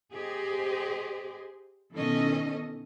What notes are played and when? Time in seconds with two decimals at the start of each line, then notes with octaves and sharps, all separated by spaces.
0.14 G4 G#4 C5 D#5
1.94 B2 D#3 E3 C#4 A4 D#5